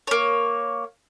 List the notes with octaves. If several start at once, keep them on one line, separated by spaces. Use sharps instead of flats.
A#3 C#5